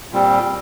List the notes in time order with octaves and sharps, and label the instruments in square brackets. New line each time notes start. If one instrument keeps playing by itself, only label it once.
[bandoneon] A#2 G3 C4